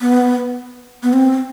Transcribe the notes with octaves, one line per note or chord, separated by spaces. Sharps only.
B3
B3
C4